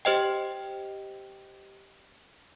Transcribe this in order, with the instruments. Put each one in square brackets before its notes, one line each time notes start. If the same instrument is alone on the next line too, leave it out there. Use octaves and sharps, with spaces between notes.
[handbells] G4 C5 D#5 G5